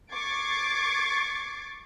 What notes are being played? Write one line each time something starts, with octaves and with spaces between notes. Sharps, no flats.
C#6 D6 G#6 A6 C7 D7